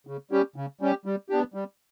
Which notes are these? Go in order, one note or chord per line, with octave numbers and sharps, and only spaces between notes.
C#3
G3 C#4 G4
C#3
G3 C#4 G4
G3
B3 D4 G4
G3